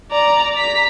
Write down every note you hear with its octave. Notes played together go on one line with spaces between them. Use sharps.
D5 A#5
A#5 B6